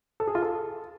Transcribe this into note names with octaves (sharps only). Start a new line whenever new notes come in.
A4
G#4
F4
A4